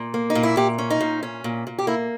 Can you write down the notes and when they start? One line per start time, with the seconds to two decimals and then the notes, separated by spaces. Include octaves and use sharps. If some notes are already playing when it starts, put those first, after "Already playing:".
Already playing: A#2
0.14 A#3
0.30 D#4
0.35 A#2
0.43 E4
0.57 A#2 G4
0.78 C#4
0.90 D#4
1.00 A#2
1.23 C#4
1.44 A#2
1.67 A#2
1.78 G4
1.87 A#3 E4